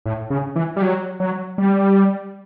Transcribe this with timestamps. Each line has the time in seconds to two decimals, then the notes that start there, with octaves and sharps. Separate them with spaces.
0.06 A2
0.30 C#3
0.56 E3
0.76 G3
0.82 F#3
1.20 F#3
1.58 G3